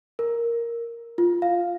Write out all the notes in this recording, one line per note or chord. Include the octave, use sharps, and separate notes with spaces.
A#4
F4
F5